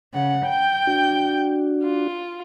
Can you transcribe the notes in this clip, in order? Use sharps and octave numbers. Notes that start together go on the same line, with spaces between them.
C#3 F#5
G5 G6
D4 F#4
F4